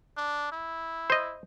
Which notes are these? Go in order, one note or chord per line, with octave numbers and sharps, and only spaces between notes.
D4
E4
C5 D#5